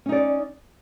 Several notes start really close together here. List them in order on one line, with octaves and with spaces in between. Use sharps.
C#4 D#4 D5